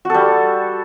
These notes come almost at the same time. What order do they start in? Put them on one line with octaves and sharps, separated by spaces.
F#4 A4 G3